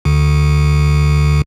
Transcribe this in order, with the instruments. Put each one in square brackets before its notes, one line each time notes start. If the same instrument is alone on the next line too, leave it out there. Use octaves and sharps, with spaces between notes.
[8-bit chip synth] D2 D3